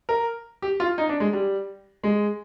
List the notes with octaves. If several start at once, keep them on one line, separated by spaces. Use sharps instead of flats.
A#4
G4
F4
D#4
D4
G#3
G3
G#3